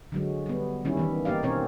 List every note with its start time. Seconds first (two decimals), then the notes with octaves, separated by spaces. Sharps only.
0.12 D3 F#3 G#3
0.46 G3 B3
0.85 D#3 G3 C#4 E4
0.97 D#3 E3 B3
1.25 A#3 D#4 G4 D5 F5
1.43 B2 C4 C#4 A#4 C#5